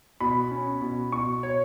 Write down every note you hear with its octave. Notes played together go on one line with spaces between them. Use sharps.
B2 B5
C#4
B2
B2 C#6
B2 C#5